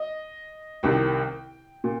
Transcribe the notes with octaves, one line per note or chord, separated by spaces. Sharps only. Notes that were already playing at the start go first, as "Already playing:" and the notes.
Already playing: D#5
C2 C3 D#3 G5
A#2